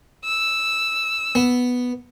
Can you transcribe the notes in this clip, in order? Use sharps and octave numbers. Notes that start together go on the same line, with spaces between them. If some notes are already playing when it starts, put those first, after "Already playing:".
E6
B3